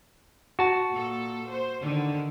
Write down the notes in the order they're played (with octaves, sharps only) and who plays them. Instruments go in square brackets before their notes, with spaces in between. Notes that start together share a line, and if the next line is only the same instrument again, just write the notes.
[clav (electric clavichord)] F#4 A5
[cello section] A#2 A4
C5
D3 D#3